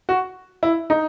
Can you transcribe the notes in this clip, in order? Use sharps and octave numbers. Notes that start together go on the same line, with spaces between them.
F#4
E4
D#4